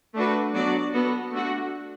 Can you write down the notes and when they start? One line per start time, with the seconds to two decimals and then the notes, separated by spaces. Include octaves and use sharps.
0.15 A3 D4 F#4 B4
0.54 F#3 B3 D4 F#4 D5
0.93 B3 F#4 A4
1.32 A3 D4 F#4